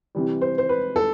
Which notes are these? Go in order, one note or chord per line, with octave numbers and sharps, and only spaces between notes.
C3 E3 G3
C5
C5
B4
A4